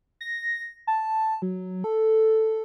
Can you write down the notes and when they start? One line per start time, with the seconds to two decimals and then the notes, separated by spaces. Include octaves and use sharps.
0.21 A#6
0.87 A5
1.42 F#3
1.84 A4